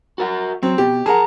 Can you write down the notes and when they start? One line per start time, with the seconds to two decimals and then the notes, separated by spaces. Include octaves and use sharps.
0.18 F#4 A#4 F#5
0.63 F#3 C4
0.78 B2 G4
1.06 G#4 A#4 F#5 A5 A#5